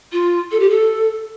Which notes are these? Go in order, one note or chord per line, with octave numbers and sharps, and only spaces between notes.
F4
A4
G4
A4